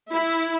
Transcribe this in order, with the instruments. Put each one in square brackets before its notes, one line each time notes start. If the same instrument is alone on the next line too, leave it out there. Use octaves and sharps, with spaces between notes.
[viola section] E4